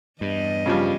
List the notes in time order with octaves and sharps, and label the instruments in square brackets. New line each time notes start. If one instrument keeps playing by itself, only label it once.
[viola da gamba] E2 D#5 [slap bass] G2
[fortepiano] C#3 F3 G3